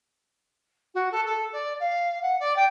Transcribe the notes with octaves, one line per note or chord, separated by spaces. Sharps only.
F#4
A4
A4
D5
F5
F#5
D5
G5